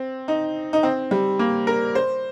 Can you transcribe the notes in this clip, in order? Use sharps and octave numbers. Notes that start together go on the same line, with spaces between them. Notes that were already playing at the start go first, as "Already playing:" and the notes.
Already playing: C4
D#4
D#4
C4
G3
A#3
A#4
C5